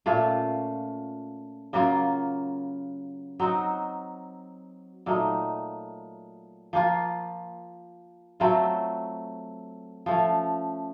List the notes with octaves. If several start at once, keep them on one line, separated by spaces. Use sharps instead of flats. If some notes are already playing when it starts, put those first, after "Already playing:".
A#2 A3 C#4 F4
C#3 F#3 A#3 F4
F#3 C4 D#4 F#4
A#2 F#3 A3 D#4
F3 A#3 F4
F#3 A3 C4 F4
F3 A3 C#4